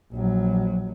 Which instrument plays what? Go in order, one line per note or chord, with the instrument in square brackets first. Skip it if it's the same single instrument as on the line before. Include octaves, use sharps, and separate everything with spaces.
[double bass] A#1 F#3